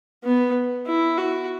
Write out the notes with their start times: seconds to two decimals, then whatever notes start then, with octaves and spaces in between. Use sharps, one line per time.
0.24 B3
0.86 E4
1.18 F#4